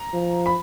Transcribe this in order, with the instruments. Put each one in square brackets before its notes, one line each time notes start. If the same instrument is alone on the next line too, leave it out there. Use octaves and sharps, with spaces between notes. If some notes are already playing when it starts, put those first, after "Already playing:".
Already playing: [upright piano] A#5
[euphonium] F3
[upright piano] B5